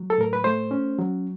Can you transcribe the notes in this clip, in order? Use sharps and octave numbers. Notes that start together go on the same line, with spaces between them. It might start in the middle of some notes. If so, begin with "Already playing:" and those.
Already playing: F#3
A4
A2 A#4
B4
A3 C5
C#4
F#3